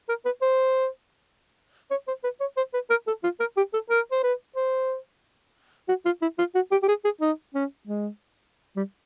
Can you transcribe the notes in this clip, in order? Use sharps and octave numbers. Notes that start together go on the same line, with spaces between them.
A#4
B4
C5
C#5
C5
B4
C#5
C5
B4
A#4
A4
F4
A#4
G4
A4
A#4
C5
B4
C5
F#4
F4
E4
F4
F#4
G4
G4
G#4
G#4
D#4
C#4
G#3
G3